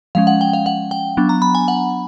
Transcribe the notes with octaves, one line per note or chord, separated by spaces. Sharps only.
F3 G#3 C#4 F5
F#5
G5
F5
F#5
G5
F#3 B3 D4
A#5
B5
G#5
F#5